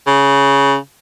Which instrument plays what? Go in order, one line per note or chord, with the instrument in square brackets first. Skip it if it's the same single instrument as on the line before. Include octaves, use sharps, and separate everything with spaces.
[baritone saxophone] C#3